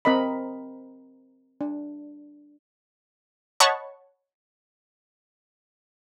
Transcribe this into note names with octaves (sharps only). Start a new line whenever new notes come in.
C4 A#4 D#5 B5
D4
C#5 D#5 F#5 A5 B5 C#6